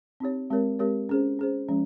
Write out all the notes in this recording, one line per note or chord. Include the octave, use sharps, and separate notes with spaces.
C4 D#4 G4 C#5
G#3 C4 G4 A#4 C#5
G#3 C4 G4 A#4 C#5
C#4 G#4 C5
C#4 G#4 C5
F3 G#3 C#4